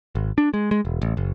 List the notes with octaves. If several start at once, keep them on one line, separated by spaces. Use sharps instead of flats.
G#1
D4
G#3
G#3
E1
A1
F#1